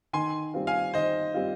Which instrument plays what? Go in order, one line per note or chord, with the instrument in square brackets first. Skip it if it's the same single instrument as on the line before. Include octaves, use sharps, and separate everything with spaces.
[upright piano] D#3 [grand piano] G#5 C6
[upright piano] G3 C4 F4
[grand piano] F5 G#5
[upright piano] D#3 [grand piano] C5 D#5
[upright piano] G3 C4 F4